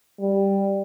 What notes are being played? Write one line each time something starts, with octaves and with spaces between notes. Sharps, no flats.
G3